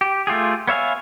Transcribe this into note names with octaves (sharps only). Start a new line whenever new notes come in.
G4
A3 F4 G4 G#4
B3 C#5 E5 F5 G#5